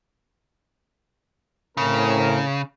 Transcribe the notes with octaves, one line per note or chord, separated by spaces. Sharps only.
A2 C#3 C4 A#4